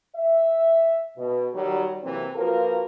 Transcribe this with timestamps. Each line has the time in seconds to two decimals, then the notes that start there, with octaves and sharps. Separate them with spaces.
0.16 E5
1.17 B2
1.53 D#3 F#3 G3
2.03 C3 E3 F#3 A#3 C4
2.36 F3 A#3 F4 F#4 A#4 B4